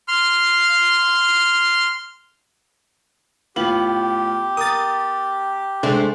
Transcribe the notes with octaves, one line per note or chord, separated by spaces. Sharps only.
C6 F6
A2 B3 F4 G4 F#7
A#4 D#6 A6
C3 G#3 A3 D4 C5